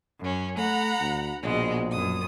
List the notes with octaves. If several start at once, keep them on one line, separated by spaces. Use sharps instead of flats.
F#2 C#4
A3 F#5 A#5 B5
D2
A#1 B2 G#3
F#2 D#6